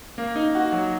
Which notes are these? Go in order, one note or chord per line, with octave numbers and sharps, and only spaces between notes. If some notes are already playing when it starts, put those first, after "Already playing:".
A#3
D#4
F#4
F#3